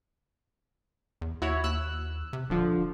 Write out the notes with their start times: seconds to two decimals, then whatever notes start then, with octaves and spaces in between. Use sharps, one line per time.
1.21 E2
1.42 D#2 E4 F#4 C#5
1.64 D#2 E6 F#6
2.33 C3
2.50 D#1 D3 F3